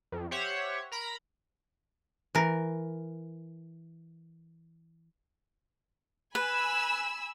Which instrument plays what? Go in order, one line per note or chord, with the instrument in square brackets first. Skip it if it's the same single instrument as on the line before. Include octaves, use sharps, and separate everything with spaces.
[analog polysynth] F2
G4 C5 C#5 E5 F#5
A#4 A#5 B5
[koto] E3 A#4
[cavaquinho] B4 [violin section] G#5 B5 E6